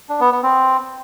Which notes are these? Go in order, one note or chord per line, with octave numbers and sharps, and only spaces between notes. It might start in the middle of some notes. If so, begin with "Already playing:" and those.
D4
B3
B3
C4